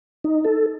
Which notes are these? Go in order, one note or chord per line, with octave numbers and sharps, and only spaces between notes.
D#4
A4